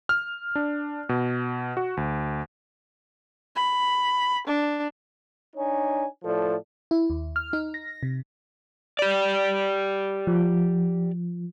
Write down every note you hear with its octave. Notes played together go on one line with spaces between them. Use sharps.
F6
D4
B2
F#4
D2
B5
D4
D4 D#4 C#5 G#5
A2 F3 A4 D5
E4
D#2
F6
D#4
A#6
C3
G4 D5
F3